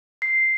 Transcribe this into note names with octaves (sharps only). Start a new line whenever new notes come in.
C7